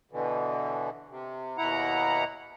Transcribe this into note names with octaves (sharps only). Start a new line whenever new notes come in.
B2 D3 E3
C3
D#2 B2 E4 F#5 A#5